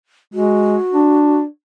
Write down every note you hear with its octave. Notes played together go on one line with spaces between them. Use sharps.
G#3 F#4
D4